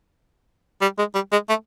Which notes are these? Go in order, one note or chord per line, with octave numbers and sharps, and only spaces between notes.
G3
G#3
G3
G#3
A3